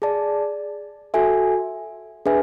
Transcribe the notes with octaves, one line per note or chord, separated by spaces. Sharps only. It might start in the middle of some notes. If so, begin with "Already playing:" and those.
G#4 D5 A5
F#4 A4 E5 G#5
D4 G#4 B4 E5 G#5